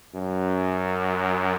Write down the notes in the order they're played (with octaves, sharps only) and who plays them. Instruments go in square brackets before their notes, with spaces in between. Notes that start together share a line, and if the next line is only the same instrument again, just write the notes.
[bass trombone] F#2